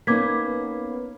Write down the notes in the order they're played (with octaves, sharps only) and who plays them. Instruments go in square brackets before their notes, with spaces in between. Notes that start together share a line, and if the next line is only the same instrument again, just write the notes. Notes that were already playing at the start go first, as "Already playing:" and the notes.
[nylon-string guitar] A#3 C#4 D#4 [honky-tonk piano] B3 [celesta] D6 G#6 B6